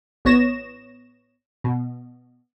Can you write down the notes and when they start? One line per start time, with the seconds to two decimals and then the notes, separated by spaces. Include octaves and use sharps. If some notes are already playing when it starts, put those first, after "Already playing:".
0.25 A1 B3 C#5 A#6 E7
1.64 B2